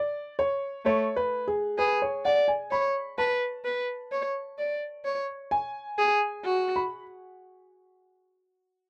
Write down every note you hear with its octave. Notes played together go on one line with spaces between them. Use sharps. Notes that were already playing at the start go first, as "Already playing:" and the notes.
Already playing: D5
C#5
A3 C#5
B4
G#4
G#4 B4
C#5
D5 F#5
G#5
C#5 B5
B4 A5
B4
C#5
D5
C#5
G#5
G#4
F#4
B5